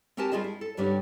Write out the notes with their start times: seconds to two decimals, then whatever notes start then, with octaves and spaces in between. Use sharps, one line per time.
0.17 C4 F#4 G4 A#4 G#5 A5
0.32 G3 F4 G#4 D#5 A5
0.44 E4
0.61 A4
0.77 G2 D3 G3 C#4 D4